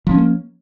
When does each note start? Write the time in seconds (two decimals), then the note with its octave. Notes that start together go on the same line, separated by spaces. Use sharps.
0.07 F3
0.10 C#4
0.14 A3
0.18 A#3